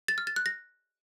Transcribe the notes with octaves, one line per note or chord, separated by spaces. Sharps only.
A6
F6
A6
F#6
A#6